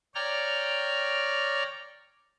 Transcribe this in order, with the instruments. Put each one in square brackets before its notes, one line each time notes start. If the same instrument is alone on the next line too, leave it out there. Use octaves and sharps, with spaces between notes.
[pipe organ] C#5 D5 G5 A#5 F6